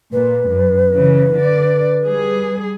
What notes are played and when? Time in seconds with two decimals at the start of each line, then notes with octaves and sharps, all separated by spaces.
0.13 A#2 B4
0.49 F#2
0.92 C#3 E3
1.34 D3 D5
2.05 G3 G#4